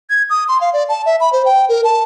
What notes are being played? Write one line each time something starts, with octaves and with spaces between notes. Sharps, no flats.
G#6
D#6
C6
F5
D5
A5
E5
B5
C5
G5
A#4
A5